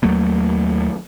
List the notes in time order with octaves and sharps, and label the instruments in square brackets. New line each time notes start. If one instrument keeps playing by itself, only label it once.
[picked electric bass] D#2 F#3 A3 A#3